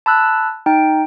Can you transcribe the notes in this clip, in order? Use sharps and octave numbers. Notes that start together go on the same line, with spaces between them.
A5 B5 E6 F#6
D#4 G5